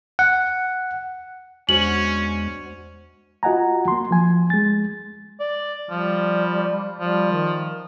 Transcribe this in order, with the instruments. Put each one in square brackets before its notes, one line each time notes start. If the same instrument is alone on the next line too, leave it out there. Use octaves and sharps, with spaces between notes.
[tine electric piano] F#5
[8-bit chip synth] E2 G#3 [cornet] C#4 [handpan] D4 F#4 C5 [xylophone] F#7
[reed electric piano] F4 F#4 D#5 F#5 G#5 A#5
A#3 C6
F3 G#5
G#3 A6
[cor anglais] D5
[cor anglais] F3 [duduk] G3
[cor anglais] F3 [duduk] G3
[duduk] D#3